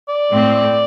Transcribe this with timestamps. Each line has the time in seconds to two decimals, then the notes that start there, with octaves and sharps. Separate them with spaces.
0.09 D5
0.31 A2 A3 C4